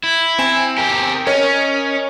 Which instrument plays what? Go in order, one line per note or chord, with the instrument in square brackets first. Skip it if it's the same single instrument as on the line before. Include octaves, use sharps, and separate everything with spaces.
[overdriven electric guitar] E4
[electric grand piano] C4 G#5 E7
[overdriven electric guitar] G4 A#4
[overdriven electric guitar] C#4 [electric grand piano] A#4 C#5 D#5